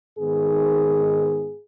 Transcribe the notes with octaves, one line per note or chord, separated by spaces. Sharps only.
G#2 D#3 B3 G#4